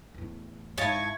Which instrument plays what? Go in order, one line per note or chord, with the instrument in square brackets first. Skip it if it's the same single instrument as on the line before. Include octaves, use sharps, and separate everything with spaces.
[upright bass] E2 A2
[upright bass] G#2 [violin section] E4 C#6 G#6 [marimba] C#5 F5 [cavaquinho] D#5 A5